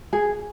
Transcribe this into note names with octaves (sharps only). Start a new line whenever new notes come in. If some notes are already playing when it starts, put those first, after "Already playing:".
G#4